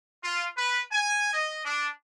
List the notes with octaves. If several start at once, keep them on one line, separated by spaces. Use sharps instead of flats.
F4
B4
G#5
D#5
D4